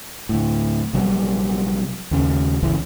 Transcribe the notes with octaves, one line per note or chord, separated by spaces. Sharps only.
D2 A2
A#1 C3 F#3 G3
D#2 C#3
G1 C#2 E3